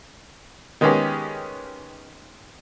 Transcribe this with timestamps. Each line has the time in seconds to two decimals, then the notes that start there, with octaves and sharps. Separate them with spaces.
0.81 D#3 G#3 B3 C#4 G4 G#4